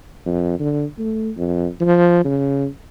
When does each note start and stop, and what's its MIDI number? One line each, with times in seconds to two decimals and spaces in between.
0.25 0.56 41
0.59 0.84 50
0.98 1.30 57
1.37 1.67 41
1.80 2.23 53
2.24 2.67 49